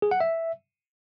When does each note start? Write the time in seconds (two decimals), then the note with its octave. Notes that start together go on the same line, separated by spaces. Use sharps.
0.02 G#4
0.11 F#5
0.20 E5